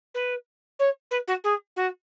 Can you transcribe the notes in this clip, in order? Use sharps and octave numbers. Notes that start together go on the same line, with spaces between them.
B4
C#5
B4
F#4
G#4
F#4